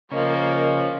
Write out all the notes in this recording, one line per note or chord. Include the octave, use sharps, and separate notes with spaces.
C#3 F3 A#3 C#4 D#5